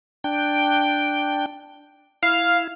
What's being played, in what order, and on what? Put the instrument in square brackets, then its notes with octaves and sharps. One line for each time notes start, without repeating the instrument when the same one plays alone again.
[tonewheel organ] D4 G5
[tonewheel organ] E4 [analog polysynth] F5